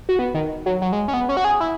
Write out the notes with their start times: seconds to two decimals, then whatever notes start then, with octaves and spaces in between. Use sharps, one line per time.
0.09 F#4
0.19 B3
0.34 D#3
0.66 F#3
0.82 F#3
0.92 G#3
1.08 C#4
1.14 B3
1.29 C#4
1.37 F#4
1.44 G#4
1.60 E4